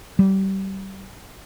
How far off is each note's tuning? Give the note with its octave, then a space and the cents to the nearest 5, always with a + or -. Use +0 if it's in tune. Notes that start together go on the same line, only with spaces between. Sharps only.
G3 -30